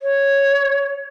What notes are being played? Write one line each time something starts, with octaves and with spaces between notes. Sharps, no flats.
C#5